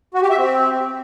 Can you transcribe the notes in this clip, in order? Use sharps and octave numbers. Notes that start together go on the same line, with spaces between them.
F#4
G4
E5
C4